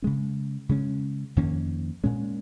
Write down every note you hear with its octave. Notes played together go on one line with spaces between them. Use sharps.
C#3 G#3 C#4
C#3 G#3 C#4
F2 D#3 A#3 C#4
A#2 G#3 C#4